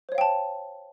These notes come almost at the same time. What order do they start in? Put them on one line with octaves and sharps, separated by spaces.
C5 C#5 F5 G5 A5